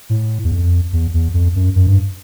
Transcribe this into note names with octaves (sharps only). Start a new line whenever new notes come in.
A2
E2
F2
E2
E2
F2
F#2
F#2
G2